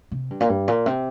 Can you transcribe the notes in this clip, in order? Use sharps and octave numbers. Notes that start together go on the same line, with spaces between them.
C3
G2
A#2
G2
A#2
C3